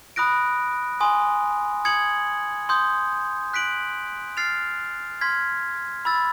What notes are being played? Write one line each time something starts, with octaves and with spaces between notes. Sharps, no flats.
B5 D#6 F#6 A#6 D7
G#5 C6 D#6
D#6 G#6 C#7 F#7
C6 D#6 G6
F#6 B6 D7 F#7
F6 A6 C7 F7
C6 F6 G#6 B6
B5 E6 A6